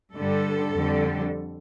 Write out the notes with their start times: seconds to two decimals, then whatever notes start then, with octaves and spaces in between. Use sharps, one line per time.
0.14 G2 D3 G3 A4
0.72 F2 D3 G3